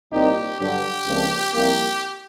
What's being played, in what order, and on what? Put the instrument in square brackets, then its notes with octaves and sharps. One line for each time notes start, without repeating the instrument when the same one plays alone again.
[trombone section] C2 A#2 G3 C4 D#4 [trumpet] G4
[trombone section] G2 D3 F#3 [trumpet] G4
[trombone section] C#2 C3 F3 A#3 D4
[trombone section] C2 C3 F3 A#3 [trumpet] G4